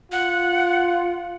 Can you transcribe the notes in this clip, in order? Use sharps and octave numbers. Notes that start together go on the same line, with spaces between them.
F4 F#5